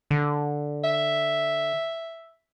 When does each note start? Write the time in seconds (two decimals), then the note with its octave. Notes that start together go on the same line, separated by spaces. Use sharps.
0.11 D3
0.84 E5